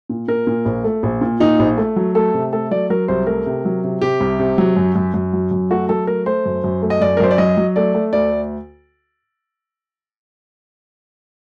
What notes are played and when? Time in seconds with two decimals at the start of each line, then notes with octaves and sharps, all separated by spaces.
0.09 A#2
0.28 A#2 A#4
0.47 A#2
0.66 A#1
0.84 A3
1.03 A#1
1.21 A#2
1.40 A#2 D#4
1.59 A#1
1.78 A3
1.96 F#3
2.15 A3 A4
2.34 C3
2.53 A3 A4
2.71 F#3 D5
2.90 F#3 A#4
3.08 C2 C5
3.27 A3 A#4
3.46 C3
3.65 F#3
3.84 C3
4.02 C3 G4
4.20 C2
4.40 C3
4.58 F#3
4.76 F#2
4.95 F#2
5.14 F#2
5.33 F#3
5.51 F#2
5.70 A3 F#4
5.89 F#3 A4
6.07 A3 A#4
6.26 A3 C5
6.46 F#2
6.64 F#2
6.82 A3
6.90 D#5
7.01 F#2 D5
7.17 A#4
7.20 F#2 C5
7.31 D5
7.38 F#3 D#5
7.57 F#3
7.76 A3 D5
7.95 A3
8.13 D2 D5